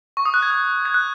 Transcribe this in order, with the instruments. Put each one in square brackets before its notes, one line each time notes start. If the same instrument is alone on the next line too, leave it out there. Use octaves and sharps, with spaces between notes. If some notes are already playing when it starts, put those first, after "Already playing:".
[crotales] C#6
D#6
F#6
G#6
F#6
G#6
F#6